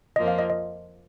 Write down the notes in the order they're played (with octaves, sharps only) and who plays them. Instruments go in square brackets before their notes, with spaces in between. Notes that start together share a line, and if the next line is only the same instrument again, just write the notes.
[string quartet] F2 F3 A#3 F4 [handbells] D#5
[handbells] F5
D#5
D#5